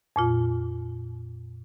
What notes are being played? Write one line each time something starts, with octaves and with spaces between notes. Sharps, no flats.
F2 A#2 F4